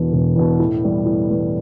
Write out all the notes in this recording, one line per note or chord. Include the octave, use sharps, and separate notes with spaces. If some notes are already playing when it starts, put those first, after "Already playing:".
Already playing: E1 E2 B2
E1
E2 B2
A2
E3 G3 B3
A2
E3 G3 B3